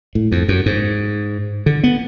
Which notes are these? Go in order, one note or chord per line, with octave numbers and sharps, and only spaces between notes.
A2
F2
F#2
G#2
D3
B3